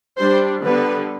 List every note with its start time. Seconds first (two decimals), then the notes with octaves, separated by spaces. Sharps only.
0.17 G3 D4 C5
0.63 D3 G3 B3 B4